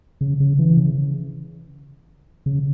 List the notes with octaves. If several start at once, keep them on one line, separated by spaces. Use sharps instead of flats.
C#3
C#3
E3
C#3
C#3